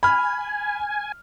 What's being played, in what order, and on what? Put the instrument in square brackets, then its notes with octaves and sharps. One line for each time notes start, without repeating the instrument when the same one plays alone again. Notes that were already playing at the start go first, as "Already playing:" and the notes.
[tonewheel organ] G#5 [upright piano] B5 F6